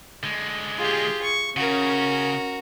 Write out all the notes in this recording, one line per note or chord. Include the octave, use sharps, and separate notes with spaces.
D3 G#3
F4 G4 G#4
C#6
C#3 C#4 F#4 A#4